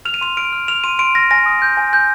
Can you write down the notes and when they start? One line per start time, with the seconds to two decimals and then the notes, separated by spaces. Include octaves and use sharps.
0.05 F6 F7
0.14 D#7
0.21 C6 F7
0.37 F6 D7
0.53 F6
0.68 F6 F7
0.84 C6 D#7
0.99 C6 D7
1.15 F6 A#6
1.31 G#5 A#6
1.46 D#6
1.62 G6
1.77 G#5
1.93 G6